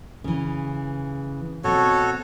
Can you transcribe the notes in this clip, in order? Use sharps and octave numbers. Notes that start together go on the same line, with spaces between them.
C#3 E3
B2 C4 F#4 A4 C#5